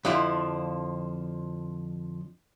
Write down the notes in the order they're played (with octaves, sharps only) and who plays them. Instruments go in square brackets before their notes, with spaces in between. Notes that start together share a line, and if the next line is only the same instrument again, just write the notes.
[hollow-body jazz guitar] F2 D3 F3 E4